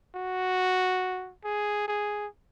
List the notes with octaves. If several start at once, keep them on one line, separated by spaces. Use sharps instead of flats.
F#4
G#4
G#4